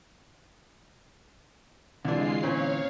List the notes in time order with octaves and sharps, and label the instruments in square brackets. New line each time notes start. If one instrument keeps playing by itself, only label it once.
[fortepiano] C2 D4 [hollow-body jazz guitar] D3 E3 [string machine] G#3 F4 C7
[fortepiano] A#2 C4 C#4 [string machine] C#5 F5